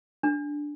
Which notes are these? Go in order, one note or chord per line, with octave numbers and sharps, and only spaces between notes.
D4